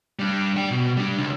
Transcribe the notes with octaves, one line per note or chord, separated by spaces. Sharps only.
G3 D4
D5 G5
B2
G3 D4
C#2